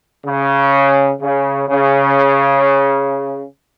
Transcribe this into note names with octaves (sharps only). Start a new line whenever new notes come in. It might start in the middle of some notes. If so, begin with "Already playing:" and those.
C#3
C#3
C#3